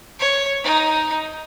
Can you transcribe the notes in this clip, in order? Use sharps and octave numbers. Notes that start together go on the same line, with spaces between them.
C#5
D#4